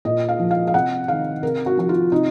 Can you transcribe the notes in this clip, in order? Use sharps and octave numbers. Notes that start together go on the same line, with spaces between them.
A#2 D#5
F5
F3
F5
F5
C3 F#5
D#3 F5
C3 A#4
F#4
F3 F#4
F4
C3 D#4